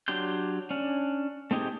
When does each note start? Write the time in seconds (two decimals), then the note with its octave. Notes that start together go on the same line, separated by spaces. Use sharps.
0.08 F#3 D4 G4 C6 G6
0.70 C#4 D4
1.51 A3 C4 D#4 G4 G#4